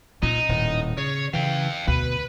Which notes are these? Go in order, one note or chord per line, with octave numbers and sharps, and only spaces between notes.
A#2 C#4 D#4
D#1 A2
C#3 C#5
C#3 E3 F5 G5
D2 B2 B4